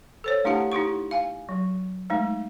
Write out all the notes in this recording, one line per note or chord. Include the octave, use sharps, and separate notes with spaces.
A4 C5 C#5
A3 D4 E4 G4 F#5 A5
D#4 E4 G4 C#6
F5 G#5
F#3
G#3 A3 D#4